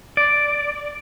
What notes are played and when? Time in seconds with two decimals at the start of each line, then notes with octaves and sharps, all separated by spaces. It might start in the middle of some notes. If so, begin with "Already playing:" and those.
0.17 D5